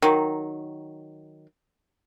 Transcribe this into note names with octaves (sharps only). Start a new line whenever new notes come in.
D#3 F#3